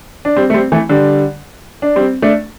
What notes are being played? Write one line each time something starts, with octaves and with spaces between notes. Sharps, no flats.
D4
G3 C4
A3
G3 C4
E3 A3
D3 G3
D4
G3 C4
A3 D4